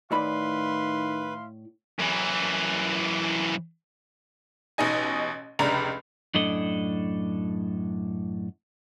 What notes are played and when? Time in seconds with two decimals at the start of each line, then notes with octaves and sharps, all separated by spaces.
0.12 A2 D#3 E4 B4 D5 F5 B5 C6
1.99 F#2 E3
4.78 A1 B2 D#4 D#5 G#5
5.59 F1 C#2 D4 A#5 B5 F7
6.35 F#2 A2 D4 A4 D#5